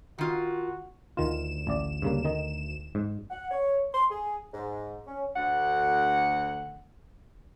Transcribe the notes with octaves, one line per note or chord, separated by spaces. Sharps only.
D#3 F4 F#4
D2 D#3 F4 E7
A1 D5
G2 C#3 A#3
D#3 D#4
G#2
F#5
C#5
C6
G#4
G#2
C#4
D2 F#5